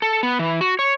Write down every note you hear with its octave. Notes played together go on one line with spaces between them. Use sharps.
A4
B3
E3
F#4
C#5